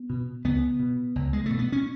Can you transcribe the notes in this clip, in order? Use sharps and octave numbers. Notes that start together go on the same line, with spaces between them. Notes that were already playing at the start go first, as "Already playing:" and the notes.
Already playing: B3
B2
C#2 B3
B2
C#2
G#3
B2 A3
B3
C#4